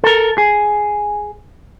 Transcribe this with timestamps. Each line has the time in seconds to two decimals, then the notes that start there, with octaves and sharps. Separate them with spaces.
0.04 A4 A#4
0.38 G#4